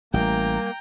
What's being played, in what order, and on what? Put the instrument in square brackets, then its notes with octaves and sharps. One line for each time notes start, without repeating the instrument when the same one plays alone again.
[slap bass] A1 [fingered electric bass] G3 [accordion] A#3 [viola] G5 A#5